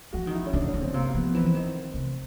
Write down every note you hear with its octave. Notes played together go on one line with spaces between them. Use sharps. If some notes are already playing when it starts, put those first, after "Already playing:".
F3 F#4
D#3
E4
C#4
D3 D4
D4
C#4
D3
C4
C3 A#3
A#3
F3 B3
B3
E3 C4
D#3
C3